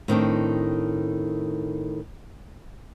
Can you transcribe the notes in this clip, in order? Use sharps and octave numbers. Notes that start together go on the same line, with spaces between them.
A2 D#3 C4 D4